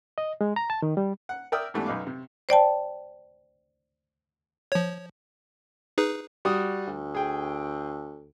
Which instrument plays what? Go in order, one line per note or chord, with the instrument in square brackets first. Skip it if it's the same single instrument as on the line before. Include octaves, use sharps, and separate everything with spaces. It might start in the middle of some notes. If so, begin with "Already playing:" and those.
[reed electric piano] D#5
G#3
A#5
A5
D#3
G3
[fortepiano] F#5
A#4 D5 E5 G5 D#6 E6
G#2 E3 G3 A3 B3 D4
B1 F#2 D#4 B4 F5 D6
C3
[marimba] C5 D5 G5 A5
[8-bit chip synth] F3 C#5
D#4 G#4 B4
[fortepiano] G3 F#4 D#6
[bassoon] D2
[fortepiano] G#4 G5